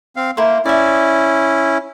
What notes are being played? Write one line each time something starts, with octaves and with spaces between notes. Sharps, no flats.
C4 F5
A#3 E4 A#4 C5
C#4 E4 D5 E5